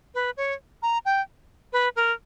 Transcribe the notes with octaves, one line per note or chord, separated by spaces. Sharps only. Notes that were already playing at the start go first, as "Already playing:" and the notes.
B4
C#5
A#5
G5
B4
A#4